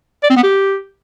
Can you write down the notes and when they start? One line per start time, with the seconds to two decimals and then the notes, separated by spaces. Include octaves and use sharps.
0.23 D5
0.30 C4
0.36 B3
0.43 G4